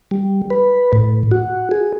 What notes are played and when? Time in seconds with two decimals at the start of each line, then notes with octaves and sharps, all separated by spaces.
0.11 G3
0.50 B4
0.93 A2
1.31 F#4
1.71 G#4